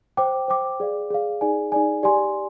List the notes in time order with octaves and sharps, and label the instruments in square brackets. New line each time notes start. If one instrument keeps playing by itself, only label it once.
[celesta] C5 G5 D6
C5 G5 D6
G#4 D5 F5
G#4 D5 F5
D#4 G#4 D5 G#5
D#4 G#4 D5 G#5
G4 D5 G#5 C6